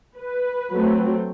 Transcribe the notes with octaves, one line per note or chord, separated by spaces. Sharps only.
B4
F#3 A3 C4